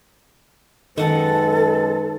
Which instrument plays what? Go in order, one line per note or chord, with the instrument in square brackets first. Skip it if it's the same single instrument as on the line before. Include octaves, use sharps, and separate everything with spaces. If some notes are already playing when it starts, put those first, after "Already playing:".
[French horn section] F#2 G#3 B4 [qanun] D#3 F#5 [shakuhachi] A4